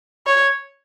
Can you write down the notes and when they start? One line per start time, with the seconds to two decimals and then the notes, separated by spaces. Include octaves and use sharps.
0.27 C#5